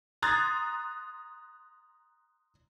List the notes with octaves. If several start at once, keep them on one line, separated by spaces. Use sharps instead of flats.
A#5 C6 D#6 F#6 G#6 A6